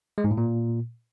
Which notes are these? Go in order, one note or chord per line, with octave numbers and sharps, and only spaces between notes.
G#3
G#2
A2
A#2